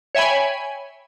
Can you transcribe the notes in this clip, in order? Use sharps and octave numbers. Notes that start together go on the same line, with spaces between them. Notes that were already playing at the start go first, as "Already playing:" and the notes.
C#5 E5 G5 G#5 B5